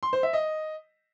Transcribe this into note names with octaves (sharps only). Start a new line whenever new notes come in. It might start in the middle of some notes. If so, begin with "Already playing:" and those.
C6
C5
E5
D#5